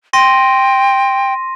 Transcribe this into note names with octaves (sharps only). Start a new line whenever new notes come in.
G5 C6 A#6 D#7